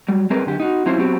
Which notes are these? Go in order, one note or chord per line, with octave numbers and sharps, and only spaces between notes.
F#3 G3
G3 C4 G#4 A#4 B4 D5
F#2 D3 G4
D#4 F#4
F#3 C4 C#4 E4 F4 C5
F#3 B3 C4 G4